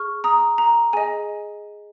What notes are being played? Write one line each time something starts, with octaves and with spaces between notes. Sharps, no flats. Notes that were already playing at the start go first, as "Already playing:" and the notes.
Already playing: G#4 C#6 F6
A#5 D#6
A#5
G#4 D#5 G#5